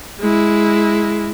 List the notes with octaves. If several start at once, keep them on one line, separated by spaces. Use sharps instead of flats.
G#3 E4